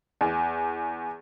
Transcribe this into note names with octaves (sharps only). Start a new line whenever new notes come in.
E2